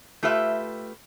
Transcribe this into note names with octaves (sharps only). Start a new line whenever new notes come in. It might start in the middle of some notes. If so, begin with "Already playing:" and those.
A3 F4 G4 B4 E5